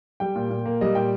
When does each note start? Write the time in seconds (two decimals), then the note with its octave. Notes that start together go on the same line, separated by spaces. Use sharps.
0.20 G3 G5
0.35 A#2
0.50 A#2
0.66 A#3
0.81 G3 D#5
0.95 A#2 G5